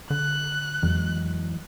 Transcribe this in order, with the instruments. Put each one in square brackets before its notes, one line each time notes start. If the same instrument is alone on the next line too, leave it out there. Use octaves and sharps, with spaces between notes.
[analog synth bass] D3 [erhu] F#6
[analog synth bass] F2 [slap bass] E3 F#3 G#3